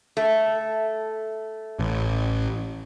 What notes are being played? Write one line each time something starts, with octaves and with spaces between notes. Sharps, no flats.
A3
A1